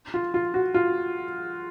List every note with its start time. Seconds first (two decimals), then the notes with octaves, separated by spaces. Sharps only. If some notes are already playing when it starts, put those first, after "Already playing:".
0.14 F4
0.34 F4
0.54 F#4
0.74 F4